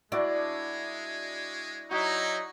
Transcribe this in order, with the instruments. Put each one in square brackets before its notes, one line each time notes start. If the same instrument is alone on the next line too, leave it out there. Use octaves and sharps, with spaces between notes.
[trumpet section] G#3 [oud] D4 [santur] E4 F#4 D5
[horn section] F#3 D#4 [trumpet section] E4 [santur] F#4